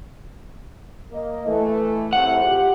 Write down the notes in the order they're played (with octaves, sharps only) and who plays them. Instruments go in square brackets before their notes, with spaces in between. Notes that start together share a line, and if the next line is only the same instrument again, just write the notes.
[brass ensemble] A#3 D#5
E3 A3
[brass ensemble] C2 A2 C3 [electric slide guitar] F#5
[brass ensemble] F3 G4